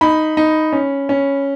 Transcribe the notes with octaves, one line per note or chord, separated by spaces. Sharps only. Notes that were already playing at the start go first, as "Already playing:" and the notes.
D#4 B5
D#4
C#4
C#4